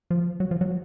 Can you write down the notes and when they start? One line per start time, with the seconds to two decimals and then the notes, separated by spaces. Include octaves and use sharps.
0.10 F3
0.40 F#3
0.51 F3
0.61 F#3